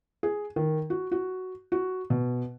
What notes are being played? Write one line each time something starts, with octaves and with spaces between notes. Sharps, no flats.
G#4
D#3
F#4
F#4
F#4
B2